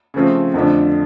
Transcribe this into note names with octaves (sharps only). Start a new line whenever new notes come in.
C#3 F3 A3 C4
F2 D3 F3 A3 D4